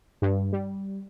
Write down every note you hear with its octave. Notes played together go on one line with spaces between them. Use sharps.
G2
G3